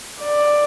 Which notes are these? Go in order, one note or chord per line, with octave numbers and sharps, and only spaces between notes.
D5